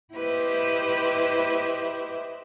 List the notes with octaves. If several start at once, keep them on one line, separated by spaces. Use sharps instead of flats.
E4 G4 B4 C5 D#5 E5